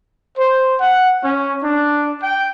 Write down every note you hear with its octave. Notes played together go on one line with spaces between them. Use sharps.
C5
F#5
C#4
D4
G5